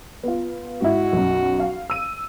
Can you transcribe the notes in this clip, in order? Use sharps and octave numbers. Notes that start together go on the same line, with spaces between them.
B3 F4
G#2 E4 F#4
B1 F#2
F5
E6 D#7